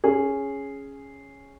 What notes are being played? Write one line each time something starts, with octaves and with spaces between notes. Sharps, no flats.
C#4 G#4